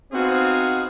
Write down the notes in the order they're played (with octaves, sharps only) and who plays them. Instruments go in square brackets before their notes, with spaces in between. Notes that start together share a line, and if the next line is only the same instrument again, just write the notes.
[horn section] B3 C4 D#4 F#4 G#4 F5